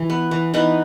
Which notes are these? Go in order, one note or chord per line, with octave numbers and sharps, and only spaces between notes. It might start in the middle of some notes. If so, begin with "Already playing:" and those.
Already playing: E3
B3
E3
E3 B3 D#4